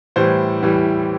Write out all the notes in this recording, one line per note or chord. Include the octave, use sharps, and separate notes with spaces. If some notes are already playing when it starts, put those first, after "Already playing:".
A2 E3 G3 C5
A2 E3 G3